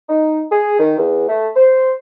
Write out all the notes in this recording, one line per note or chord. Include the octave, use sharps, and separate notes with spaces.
D#4
G#4
D#3
E2
A3
C5